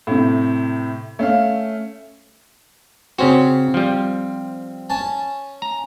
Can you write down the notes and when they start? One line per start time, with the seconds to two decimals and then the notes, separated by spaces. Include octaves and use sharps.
0.07 A2 C3
1.19 A3 C#4 F5
3.19 C#3 C4 C#4 F#4
3.74 F3 G3
4.90 C#4 A5
5.62 A#5